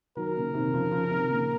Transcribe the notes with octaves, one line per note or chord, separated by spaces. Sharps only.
D#3 F#3 A#4
A#2 C#3
C3 D#3
C#3 F3
C#3 F3
C3 D#3
A#2 C#3